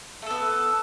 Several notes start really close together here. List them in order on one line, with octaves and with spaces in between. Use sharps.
A3 A4 B3